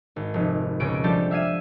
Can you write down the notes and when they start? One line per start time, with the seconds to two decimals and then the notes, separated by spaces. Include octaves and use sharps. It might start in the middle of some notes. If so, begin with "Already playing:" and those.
0.16 G#1
0.34 F1
0.80 C#2 B2 C#4 D7
1.04 F3 G3 A3 D4 G4 A4
1.31 E5 F5 G#6 D#7